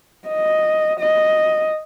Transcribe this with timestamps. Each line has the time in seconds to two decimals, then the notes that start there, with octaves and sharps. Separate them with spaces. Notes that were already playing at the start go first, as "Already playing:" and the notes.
0.28 D#5
1.00 D#5